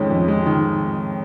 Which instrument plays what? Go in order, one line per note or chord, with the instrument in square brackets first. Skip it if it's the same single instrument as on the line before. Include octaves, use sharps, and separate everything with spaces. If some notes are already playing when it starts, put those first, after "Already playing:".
Already playing: [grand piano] F2 D#3 G#3 C#4
F2
G#3
D#3